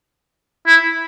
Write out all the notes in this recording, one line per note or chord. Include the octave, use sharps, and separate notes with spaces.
E4